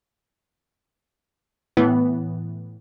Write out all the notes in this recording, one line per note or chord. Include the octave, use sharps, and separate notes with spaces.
A2 E3 B3